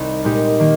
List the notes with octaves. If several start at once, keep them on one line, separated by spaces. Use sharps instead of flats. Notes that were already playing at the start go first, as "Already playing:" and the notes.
Already playing: C2 C4 D#4
A#2 G#3 D#4 G4
D#3 A#3